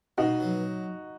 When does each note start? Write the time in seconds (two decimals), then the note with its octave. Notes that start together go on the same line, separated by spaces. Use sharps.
0.18 B2 D#4 F#4
0.40 F#3